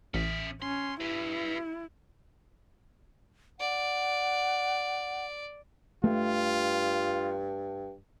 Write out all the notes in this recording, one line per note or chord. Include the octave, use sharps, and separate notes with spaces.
A1 C#4 E5
C#4 C6
E4 G4 B4
D5 F#5
G2 A3 F4